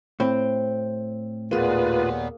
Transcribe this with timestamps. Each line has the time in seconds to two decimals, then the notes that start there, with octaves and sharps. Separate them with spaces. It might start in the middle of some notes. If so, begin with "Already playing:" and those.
0.20 A2 C4
1.51 D#2 A#2 A#3 B3 F4 G#4 B4